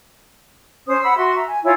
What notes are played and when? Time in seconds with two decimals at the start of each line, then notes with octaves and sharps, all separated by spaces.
0.87 C#4 C5 D#6
1.01 F#5 B5 E6
1.16 F#4 E5 C6
1.34 E5 A#5
1.47 G#5
1.63 E4 F4 C#5 G#5